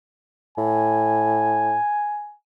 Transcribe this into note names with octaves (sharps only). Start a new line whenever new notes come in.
A2 G#5